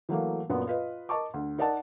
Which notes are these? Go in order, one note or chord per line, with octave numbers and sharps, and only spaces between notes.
E3 F#3 A3 A#3
F#2 A#2 B3
F4 B4 D#5
A#4 D#5 A5 C#6 D6
D2
D#4 A#4 D5 D#5 F#5 A5